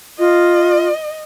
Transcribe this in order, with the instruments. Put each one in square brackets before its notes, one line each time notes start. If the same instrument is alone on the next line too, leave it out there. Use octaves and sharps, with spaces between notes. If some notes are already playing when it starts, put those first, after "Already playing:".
[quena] F4 [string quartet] D#5